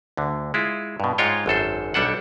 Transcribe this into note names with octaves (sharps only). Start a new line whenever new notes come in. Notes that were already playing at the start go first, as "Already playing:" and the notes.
D2 D3
G#3 E4 F4
G2 B2
G#2 G#3 F4 C#5 G5
G#1 F#2 A4 C5
B1 G3 D4 A4 F#5